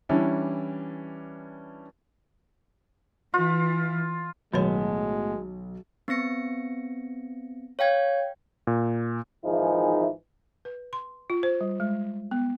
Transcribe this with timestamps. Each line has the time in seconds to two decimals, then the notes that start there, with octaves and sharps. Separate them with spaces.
0.09 E3 G3 C#4 D4 E4
3.34 E3 F4
4.53 B1 A2 D#3 F#3 G#3 B3 C#5
6.08 B3 C4 A#6 C#7
7.79 C#5 F5 G5 G#6
8.67 A#2
9.45 G#1 E3 F3 D#4 E4 G#4
10.65 B4
10.93 C6
11.30 F4
11.43 C5
11.61 G3
11.80 G#3
12.31 B3